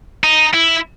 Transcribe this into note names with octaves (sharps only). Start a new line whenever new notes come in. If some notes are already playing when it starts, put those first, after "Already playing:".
D#4
E4